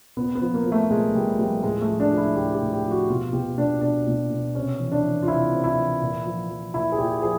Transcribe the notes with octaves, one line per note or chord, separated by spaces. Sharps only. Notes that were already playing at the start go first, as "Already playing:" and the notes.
A#2 B3
B3
F3
A#3
F3
A3
A#2 G#3
A#2 G3
F3 G3
A2 G#3
A3
F3
D4
F3
E4
A2 G4
G4
A2
G4
F3
F#4
B2 F4
B2 G4
B2 D4
B2 D4
B2
B2
C3 C#4
E3
D4
E3
F4
C3 E4
C3
E4
E3
A#2
F3
F3
A#2 E4
G#4
A#2 G4
F3 G#4